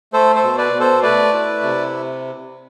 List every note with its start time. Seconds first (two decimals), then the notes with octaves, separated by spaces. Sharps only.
0.13 A3 A4 C5
0.36 A4 C5
0.43 B2
0.58 B4 D5
0.73 B2
0.80 A4 C5
1.03 A3 B4 D5
1.33 E4
1.62 C3